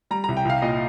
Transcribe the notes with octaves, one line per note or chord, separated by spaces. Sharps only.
G3 A#5
A#5
C2
G5
C2 F5
A#2 D#5